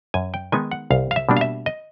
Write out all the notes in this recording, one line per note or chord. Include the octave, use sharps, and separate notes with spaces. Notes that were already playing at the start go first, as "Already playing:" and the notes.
F#2 G#5
G5
D#3 G#3 B3 D#4 G#5
F#5
C2 F5
F5
E5
B2 G3 A#3 D4
F5
E5
D#5